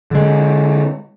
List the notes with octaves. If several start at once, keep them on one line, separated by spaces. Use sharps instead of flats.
D3 G#3